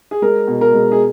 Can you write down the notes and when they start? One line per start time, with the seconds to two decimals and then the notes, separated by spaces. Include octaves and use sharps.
0.11 G#4
0.22 G#3 A#4
0.48 B2
0.61 A#4
0.74 G#3
0.92 G#4